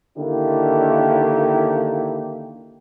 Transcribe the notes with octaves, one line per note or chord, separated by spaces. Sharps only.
D3 D#3 A#3 D4 E4 G4